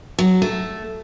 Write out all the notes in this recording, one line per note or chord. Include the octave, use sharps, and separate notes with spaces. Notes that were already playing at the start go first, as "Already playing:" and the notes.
F#3
A3